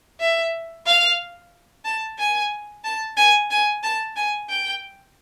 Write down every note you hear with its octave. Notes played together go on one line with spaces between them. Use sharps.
E5
F5
A5
G#5
A5
G#5
G#5
A5
G#5
G5